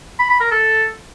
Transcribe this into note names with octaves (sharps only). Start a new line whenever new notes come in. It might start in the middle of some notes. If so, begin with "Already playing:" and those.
B5
B5
A#4
A4